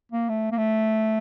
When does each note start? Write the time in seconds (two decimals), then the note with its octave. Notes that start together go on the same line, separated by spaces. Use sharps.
0.12 A#3
0.29 A3
0.52 A#3
0.58 A3